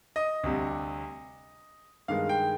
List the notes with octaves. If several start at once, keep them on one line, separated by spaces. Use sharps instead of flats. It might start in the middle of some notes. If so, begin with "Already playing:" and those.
D#5
D2 C3 G3
G2 D#3 G#3 F5
G5